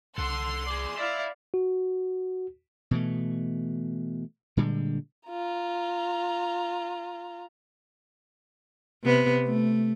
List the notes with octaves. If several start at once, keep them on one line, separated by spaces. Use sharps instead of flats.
C2 A4 F#5 C6
G#4 D5
D5 E5 F5 B5
F#4
B2 E3 A3
A#2 D3 G3 G#3
F4 A#5
C3 B3
A3